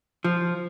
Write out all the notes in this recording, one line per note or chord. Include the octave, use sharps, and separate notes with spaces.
F3